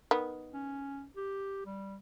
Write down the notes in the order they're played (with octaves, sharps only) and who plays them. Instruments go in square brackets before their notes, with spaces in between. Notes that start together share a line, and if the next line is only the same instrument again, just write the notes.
[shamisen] D#3 B3
[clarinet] C#4
G4
G3